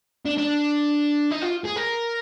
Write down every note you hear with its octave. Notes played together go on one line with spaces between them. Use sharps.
D4
D4
D#4
F4
G#4
A#4